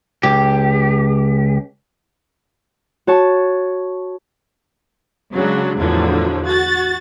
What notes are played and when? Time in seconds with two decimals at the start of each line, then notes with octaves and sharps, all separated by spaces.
0.23 C#2 G4
3.07 F#4 C#5 A5 C#6
5.33 C#3 F#3 G#3 D4
5.77 E2 A2 D3 F3 F#3
6.45 F#4 A6